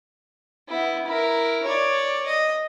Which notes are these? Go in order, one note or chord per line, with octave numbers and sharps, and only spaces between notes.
B3 E4
E4 A#4
C#5 D5
D#5